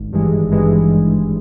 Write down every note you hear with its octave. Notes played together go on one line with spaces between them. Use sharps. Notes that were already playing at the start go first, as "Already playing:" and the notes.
Already playing: G#1
G2 E3 G#3
G#1
G2 E3 G#3